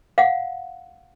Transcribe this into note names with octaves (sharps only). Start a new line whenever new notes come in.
F5 F#5